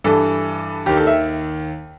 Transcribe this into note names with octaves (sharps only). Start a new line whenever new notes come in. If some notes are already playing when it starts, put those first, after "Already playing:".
G2 E3 A4
D#2 D#3 G4
A4
E5